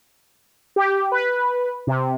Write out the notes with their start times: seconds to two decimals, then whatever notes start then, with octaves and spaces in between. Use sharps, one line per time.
0.76 G4
1.12 B4
1.87 C3